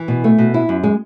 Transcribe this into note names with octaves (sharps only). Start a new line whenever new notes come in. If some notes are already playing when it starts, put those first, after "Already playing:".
Already playing: E3
B2
A3
B2
E4
F#2
G#3